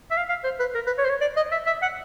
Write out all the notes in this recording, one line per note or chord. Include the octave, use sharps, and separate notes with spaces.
E5
F5
F5
C5
B4
A#4
B4
C#5
C5
C#5
D5
D#5
E5
E5
F#5